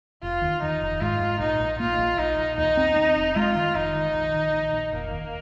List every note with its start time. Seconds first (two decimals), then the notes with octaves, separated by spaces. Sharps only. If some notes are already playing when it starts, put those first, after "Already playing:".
0.22 F1 F4
0.42 D#2
0.62 D#3 D#4
0.81 F1
1.01 G#2 F4
1.20 G#2
1.39 A#1 D#4
1.59 A#1
1.80 A#3 F4
1.98 A#1
2.18 A#1 D#4
2.38 A#1
2.57 D#2 D#4
2.77 C4
2.96 C4
3.16 F1
3.35 G#3 F4
3.55 D#3
3.74 F1 D#4
3.95 D#3
4.13 A#1
4.34 D#3
4.53 A#1
4.73 A#1
4.92 F1 A#3
5.11 D#2